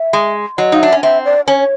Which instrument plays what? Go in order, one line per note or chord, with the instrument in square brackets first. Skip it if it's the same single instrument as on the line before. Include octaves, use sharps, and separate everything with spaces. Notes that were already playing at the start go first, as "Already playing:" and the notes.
Already playing: [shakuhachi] E5
[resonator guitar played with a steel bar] G#3
[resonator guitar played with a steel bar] F#3 [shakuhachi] D#5
[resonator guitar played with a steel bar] D#4 [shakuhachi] F5
[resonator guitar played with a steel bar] D4 [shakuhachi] E5
[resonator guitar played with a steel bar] C#4
[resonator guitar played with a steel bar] C4 [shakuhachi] E5
[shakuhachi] D5
[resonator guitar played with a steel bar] C#4 [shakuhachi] C#5